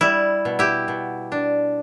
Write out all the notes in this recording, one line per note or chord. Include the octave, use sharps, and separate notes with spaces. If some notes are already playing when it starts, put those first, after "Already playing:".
G3 E4
B2
E4 G4
B2
D4